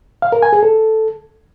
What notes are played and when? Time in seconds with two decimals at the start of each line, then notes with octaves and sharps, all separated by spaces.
0.22 F5
0.32 A#4
0.43 G#5
0.53 G#4
0.63 A4